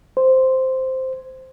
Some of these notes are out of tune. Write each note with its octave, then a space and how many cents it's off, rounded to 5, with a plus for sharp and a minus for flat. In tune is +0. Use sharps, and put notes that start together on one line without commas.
C5 -5